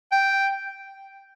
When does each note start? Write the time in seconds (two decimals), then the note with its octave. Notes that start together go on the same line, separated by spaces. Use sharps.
0.12 G5